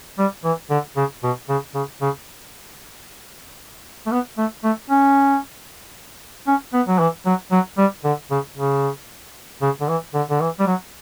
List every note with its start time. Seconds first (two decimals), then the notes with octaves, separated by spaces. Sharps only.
0.19 G3
0.44 E3
0.70 D3
0.97 C#3
1.23 B2
1.49 C#3
1.75 C#3
2.02 C#3
4.06 A3
4.11 B3
4.38 A3
4.64 A3
4.90 C#4
6.47 C#4
6.73 B3
6.88 F#3
7.00 E3
7.26 F#3
7.52 F#3
7.78 G3
8.04 D3
8.31 C#3
8.57 C#3
9.62 C#3
9.81 D3
9.89 E3
10.14 D3
10.30 D3
10.41 E3
10.59 G3
10.67 F#3